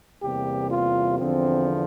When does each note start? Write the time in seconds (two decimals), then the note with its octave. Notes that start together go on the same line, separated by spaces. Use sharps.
0.22 E2 C3 G3 A#3 G4
0.70 F4
1.18 E2 D3 F3 C4